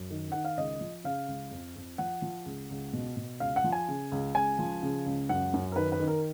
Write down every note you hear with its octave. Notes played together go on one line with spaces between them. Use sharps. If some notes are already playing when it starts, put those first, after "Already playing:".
Already playing: F#2
D#3
D#3 F#5
F5
C#2 D#5
F3
C#3 F5
C#2
F2
F2
F3 F#5
F3
C#2
C#2
B2
B2
C#2 F5
F#5
F3
G#5
C#3
C#2
C#2 G#5
F3
C#3
C#2
F#2 F#5
F#2
A#4
D#3 B4
B4
D#3
A#4